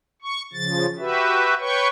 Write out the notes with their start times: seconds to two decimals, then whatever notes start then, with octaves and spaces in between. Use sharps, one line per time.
0.22 C#6
0.53 C#3 F3 A6
0.99 F#4 G4 B4 E5
1.59 B4 C#5 G5 C#6